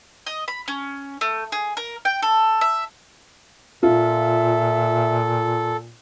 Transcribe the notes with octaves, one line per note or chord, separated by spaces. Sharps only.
D#5
B5
C#4
A3
G#4
A#4
G5
A4
E5
A#2 F4 A4 E5